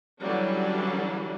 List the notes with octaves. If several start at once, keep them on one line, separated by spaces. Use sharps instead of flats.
D3 E3 F#3 G3 C#4 D4